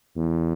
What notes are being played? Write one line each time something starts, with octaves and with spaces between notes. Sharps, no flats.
E2